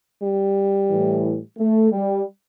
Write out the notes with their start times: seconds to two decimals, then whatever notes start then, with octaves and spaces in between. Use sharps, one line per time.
0.22 G3
0.90 A2 E3
1.58 A3
1.91 G3